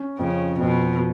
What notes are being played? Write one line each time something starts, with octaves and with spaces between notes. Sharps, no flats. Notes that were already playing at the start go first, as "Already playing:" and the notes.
Already playing: C#4
F2 C#3
F2 B2